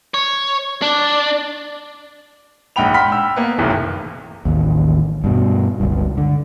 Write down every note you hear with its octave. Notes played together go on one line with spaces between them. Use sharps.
C#5
D4
A#1 G#2 F#5 G5 B5 F7
F#5 G5 B5 C6 F6 B6
G5 E6
A#3 B3
F#1 B1 A2 C3 D#3 E3
A1 D#2
G2 B2
G1 C#2 G2
D3